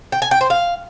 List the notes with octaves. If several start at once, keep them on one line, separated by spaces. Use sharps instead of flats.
G5
G#5
G5
C5
F5